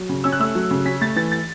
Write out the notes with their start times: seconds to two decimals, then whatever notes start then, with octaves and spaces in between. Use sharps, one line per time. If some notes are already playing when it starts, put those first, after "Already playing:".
Already playing: F#3
0.09 C#3
0.24 C#4 E6
0.32 F#6
0.40 A3 E6
0.55 F#3
0.71 C#3
0.85 C#4 B6
1.01 A3 A6
1.16 E3 A6
1.32 A6